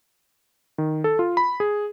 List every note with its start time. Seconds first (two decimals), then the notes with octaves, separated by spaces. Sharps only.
0.78 D#3
1.04 A4
1.19 F4
1.37 B5
1.60 G#4